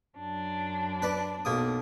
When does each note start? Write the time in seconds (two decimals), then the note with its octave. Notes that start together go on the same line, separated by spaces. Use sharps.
0.17 F#2 D4
1.02 B4 D5
1.45 B1 A#3 D#6